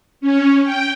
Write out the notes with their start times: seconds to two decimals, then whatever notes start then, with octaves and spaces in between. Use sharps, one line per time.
0.21 C#4
0.63 G5